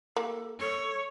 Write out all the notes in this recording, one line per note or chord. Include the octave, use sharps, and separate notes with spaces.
A#3 E4 G4 A4
A4 C#5